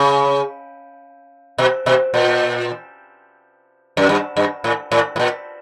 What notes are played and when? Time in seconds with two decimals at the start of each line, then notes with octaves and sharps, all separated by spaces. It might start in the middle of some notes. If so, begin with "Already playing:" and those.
Already playing: C#3
1.58 B2
1.86 B2
2.14 A#2
3.97 F#2
4.09 G2
4.36 G2
4.64 A2
4.92 A2
5.16 A2
5.19 A#2